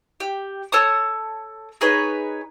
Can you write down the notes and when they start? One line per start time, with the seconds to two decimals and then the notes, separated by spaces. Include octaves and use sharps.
0.20 G4
0.72 A4 C#5 A5 D#6
1.81 D#4 G#4 B4 C#5